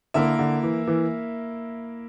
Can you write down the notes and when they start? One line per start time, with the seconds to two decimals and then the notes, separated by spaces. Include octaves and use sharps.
0.14 D3 A#3 E4 A#4 E5
0.39 D3
0.63 E3
0.87 E3